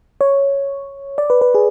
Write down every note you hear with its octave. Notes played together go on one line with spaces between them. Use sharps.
C#5
D5
B4
B4
G#4